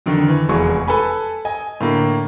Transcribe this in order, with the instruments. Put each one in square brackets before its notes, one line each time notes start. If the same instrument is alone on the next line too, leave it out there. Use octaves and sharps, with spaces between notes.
[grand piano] F2 D3 D#3
E3
F1 E2 E3 G#3 F#4 C#6
A4 B4 G#5 B5
D#5 G#5
A2 D3 A#3